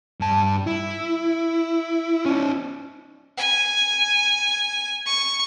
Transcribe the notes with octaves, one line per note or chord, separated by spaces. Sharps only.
G2 A5
E4
C#4 D#4
G#5
C#6